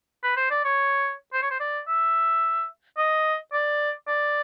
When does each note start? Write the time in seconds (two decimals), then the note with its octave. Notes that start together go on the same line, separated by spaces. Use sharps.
0.24 B4
0.37 C5
0.50 D5
0.65 C#5
1.33 C5
1.42 C#5
1.51 C5
1.60 D5
1.88 E5
2.97 D#5
3.53 D5
4.07 D5